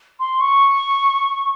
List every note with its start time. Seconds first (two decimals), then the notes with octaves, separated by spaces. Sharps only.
0.20 C6
0.41 C#6